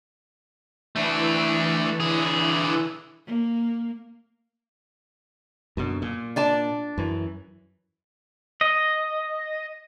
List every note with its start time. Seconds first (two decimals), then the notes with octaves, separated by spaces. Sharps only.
0.96 E3 A3 D4
2.00 D3 G#4
3.26 A#3
5.77 F#2 B2 D3
6.02 A#2
6.36 D4 D5 A5
6.98 F#2 E3
8.61 D#5